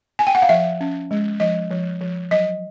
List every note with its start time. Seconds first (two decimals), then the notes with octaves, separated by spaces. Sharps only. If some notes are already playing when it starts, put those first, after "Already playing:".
0.19 G#5
0.27 G5
0.35 F#5
0.42 F5
0.49 F3 E5
0.81 C#4
1.11 G#3
1.40 F3 D#5
1.71 F3
2.01 F3
2.31 F#3 D#5